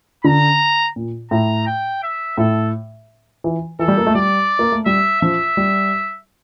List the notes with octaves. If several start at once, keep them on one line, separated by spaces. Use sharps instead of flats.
D3 A#5
A#2
A2 A#5
G5
E5
A2 A4
E3
E3 A4
G3
A#3
A3
G3 D5
A#3
A3
G3 E5
F3 E5
G3